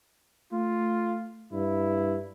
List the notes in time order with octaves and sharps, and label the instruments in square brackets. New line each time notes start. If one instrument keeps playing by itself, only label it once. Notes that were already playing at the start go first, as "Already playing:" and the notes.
[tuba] A3 [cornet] F4
[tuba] G2 [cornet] E4